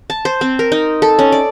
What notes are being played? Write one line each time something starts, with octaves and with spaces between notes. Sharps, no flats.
A5
C5
C4
A#4
D#4
A4
C#4
D5